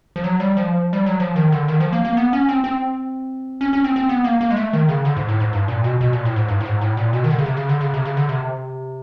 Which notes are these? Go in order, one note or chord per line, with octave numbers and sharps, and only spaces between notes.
F3
F#3
G3
F3
G3
F#3
F3
D#3
D3
D#3
F3
A#3
A#3
B3
C#4
C4
C4
C#4
C#4
C4
C4
B3
A#3
A#3
G#3
A3
D#3
C#3
D3
G#2
A2
G#2
G2
A#2
B2
B2
A#2
A2
G#2
G2
A2
G#2
A2
A#2
B2
D#3
D3
C#3
C3
C#3
D3
C#3
C3
C#3
D3
C3